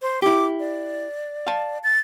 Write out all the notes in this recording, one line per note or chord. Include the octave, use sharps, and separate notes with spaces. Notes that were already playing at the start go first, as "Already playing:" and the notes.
C5
E4 G4 D6
D5
F5 A5
A6